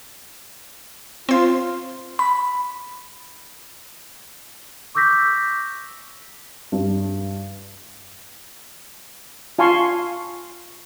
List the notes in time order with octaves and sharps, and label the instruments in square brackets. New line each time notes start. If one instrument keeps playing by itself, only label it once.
[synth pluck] C4 C5 [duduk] F4
[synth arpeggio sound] B5
[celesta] C#6 D6 E6 G6 A#6 B6
[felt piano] G2
[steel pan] F4 F5 G#5 A5 C6 C#6